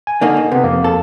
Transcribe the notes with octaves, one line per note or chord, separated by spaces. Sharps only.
G#5
D3 A#3 D#4
B2
C3 B3
F2 A#3
A4